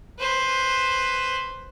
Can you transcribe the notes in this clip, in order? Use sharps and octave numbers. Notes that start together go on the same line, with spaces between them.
B4 C5